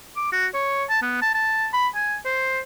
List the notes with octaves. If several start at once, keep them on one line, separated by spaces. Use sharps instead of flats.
D6
F#4
C#5
A5
B3
A5
A5
B5
G#5
C5